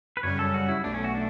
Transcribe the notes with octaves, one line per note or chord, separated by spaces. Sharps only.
B4
F#2 C#3 G3 C#4 C#5
A4
F#4
E4
B1 B2 A3 D4
C#4
F#4
D4